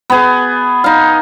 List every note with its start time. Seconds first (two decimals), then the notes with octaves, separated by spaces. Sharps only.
0.10 B3 G#4
0.84 D#4 F5